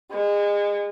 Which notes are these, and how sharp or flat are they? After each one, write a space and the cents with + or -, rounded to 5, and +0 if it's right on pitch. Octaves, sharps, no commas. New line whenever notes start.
G#3 -30